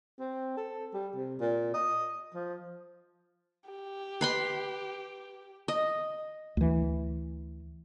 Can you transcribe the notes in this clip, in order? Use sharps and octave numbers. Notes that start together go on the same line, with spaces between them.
C4
A4
G3
C3
A#2
D#5
F3
G4
B4 B5 C6
D#5
D2 E3